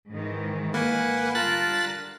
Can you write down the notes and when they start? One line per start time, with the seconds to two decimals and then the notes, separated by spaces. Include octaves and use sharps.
0.12 G#2 D#3 E3
0.74 A#3 B4 F#5 G#5
1.35 D3 G3 F4 A#4 A5 F#6 A6 B6